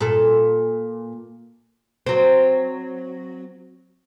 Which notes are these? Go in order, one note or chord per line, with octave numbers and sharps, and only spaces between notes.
A#2 A4
F#3 C4